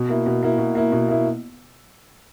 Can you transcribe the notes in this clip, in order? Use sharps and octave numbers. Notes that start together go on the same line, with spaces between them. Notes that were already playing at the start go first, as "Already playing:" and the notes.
Already playing: B2
A#3 E4
B2
A#3 E4
B2
A#3 E4
B2
A#3 E4